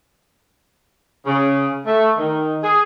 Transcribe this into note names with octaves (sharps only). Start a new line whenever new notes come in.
C#3
A3
D#3
G#4